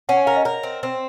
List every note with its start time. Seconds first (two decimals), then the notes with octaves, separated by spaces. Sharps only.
0.09 C#4 F#5
0.17 G#5
0.26 A#4 F5
0.36 D#5
0.45 A#4 C#5
0.63 C4
0.83 C4